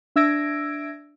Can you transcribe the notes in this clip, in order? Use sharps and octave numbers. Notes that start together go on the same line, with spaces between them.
D4 E5 E6 G#6 A#6 D7